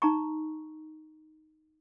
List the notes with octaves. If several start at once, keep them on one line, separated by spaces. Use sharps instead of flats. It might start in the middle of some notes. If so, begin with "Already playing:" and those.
D#4 A#5 C#6